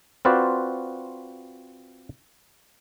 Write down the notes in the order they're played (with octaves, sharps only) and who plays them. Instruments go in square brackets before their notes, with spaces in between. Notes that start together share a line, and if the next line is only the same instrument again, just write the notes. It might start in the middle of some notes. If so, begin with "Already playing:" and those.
[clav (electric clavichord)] C4 F4 F#4 B4 C5 D5